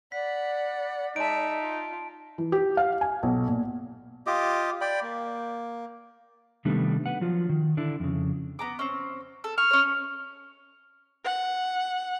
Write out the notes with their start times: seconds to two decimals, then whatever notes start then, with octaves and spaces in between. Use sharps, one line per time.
0.12 D5 F#5 B5 B6
1.16 G#3 D#4 E5 A5 D7
1.60 F4
2.38 E3
2.52 G4
2.77 F5
3.01 G#5
3.23 B1
3.48 A#2
4.27 F4 G4 D#5 D6
4.81 D5 G5 B5
5.02 A#3
6.65 C3 D#3 G3 A3 B3 D4
7.06 B4 F#5
7.21 F3 F#3 F4
7.49 D#3
7.77 D3 D4 E4
8.00 F2 C#3
8.59 B3 A#5 D6
8.79 C4 C#4
9.44 A4
9.58 C#6 F6
9.71 C#4 C#5
11.24 F#5